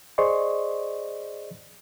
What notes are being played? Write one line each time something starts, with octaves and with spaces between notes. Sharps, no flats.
G#4 C5 D5 D#5 C6 C#6